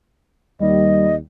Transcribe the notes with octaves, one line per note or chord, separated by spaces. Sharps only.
D#2 G3 D#5